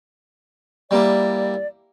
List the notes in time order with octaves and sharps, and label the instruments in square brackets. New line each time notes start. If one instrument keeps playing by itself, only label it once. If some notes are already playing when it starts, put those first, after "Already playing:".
[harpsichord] G3 A#3 E4 [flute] D5